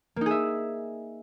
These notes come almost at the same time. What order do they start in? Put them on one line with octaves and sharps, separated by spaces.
A#3 D#4 G#4 E5